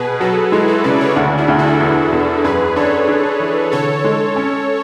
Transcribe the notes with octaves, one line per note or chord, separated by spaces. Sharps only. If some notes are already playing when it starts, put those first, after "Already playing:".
Already playing: B2 G#4 B4
F#3 F#4 A4
G#3 E4 G#4
F#4 A4
C#3 B4 D5
A4 C#5
D2 D4 F#4
E4 G#4
D2
F#4 A4
E2
E2
F#2 G#4 B4
D4 A4 C#5
D4
E3
D3 A4 C#5
G#3
C#4